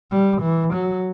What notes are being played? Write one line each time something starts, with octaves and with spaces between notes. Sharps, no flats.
G3
E3
F#3